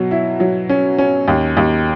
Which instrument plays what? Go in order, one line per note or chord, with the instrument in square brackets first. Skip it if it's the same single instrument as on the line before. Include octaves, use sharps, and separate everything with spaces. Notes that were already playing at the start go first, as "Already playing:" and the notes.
Already playing: [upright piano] B2 F#3
E4
F#3
C#4
C#4
D#2
D#2